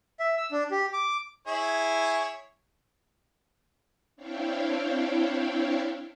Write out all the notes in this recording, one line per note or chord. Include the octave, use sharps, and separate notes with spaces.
E5
E6
D4
G4
D6
E4 G#4 C#5
C4 D4 E4 C#5 F5 G5